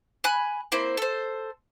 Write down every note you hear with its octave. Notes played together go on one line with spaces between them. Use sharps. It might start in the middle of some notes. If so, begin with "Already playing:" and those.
G#5 B5 F#6
A#3 C4 E4 C5
A4 C5